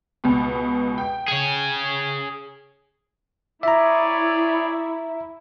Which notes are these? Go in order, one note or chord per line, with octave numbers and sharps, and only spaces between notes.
C#2 B2
G5
G#4 C#5
E4 G#4 C#5 D5 E5 A#5